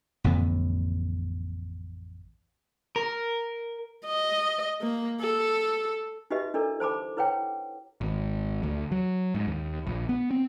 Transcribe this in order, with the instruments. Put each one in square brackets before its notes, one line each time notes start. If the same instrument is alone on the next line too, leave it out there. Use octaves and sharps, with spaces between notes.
[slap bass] A1 F2 D3 B3
[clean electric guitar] A#4
[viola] D#5
A#3
A4
[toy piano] D#4 F#4 G4 B4 D#5 E5
D4 E4 A4 A#4 D5
C5 A5 B5 D6
E4 B4 C#5 F#5 G5
[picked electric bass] G#1
D2
F#3
G#2
D#2
A#1
B3
C4